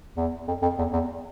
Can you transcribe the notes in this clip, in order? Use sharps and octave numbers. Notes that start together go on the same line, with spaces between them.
E2
F2
F2
E2
E2